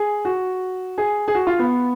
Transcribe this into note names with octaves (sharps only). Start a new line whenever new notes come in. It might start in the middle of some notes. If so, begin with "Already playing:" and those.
Already playing: G#4
F#4
G#4
G#4
F#4
F4
B3